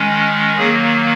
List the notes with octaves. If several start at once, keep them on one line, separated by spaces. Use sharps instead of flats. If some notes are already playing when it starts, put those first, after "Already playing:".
Already playing: D#3 G#3 C#4
D#3 F#3 A#3 G#4